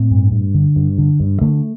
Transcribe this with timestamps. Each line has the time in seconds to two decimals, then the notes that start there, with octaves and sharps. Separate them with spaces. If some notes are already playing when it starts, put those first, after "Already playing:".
Already playing: A2 C4
0.11 G2
0.32 G2
0.55 D3
0.76 G2
0.98 D3
1.20 G2
1.41 D3 A3